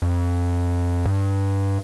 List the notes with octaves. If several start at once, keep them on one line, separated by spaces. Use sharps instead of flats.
F2
G2